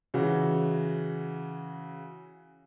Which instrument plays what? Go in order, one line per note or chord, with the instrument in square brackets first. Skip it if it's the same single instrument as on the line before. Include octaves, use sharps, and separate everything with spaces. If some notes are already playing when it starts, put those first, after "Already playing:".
[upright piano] C#3 E3 F#4